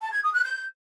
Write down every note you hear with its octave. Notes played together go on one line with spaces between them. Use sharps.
A5
G#6
D#6
F#6
G6